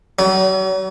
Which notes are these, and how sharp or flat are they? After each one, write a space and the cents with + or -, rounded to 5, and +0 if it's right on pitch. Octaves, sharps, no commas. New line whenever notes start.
F#3 +40